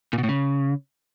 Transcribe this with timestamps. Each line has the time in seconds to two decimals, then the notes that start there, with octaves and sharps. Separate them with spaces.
0.13 A#2
0.18 B2
0.23 A2
0.29 C#3